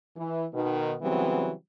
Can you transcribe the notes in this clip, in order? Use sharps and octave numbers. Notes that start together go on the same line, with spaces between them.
E3
B2 D#3 B3
C#3 E3 F#3 G3 B3 C4